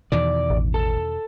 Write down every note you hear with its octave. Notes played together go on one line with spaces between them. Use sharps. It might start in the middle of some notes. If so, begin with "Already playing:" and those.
E2 B2 D#3 D5
A1
A4